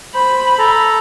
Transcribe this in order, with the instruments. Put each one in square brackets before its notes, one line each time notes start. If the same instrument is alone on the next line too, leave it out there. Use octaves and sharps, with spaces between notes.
[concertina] C5 [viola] B5
[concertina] A4 A#5